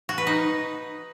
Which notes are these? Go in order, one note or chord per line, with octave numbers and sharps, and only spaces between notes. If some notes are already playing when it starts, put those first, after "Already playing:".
F#4
B4
D#4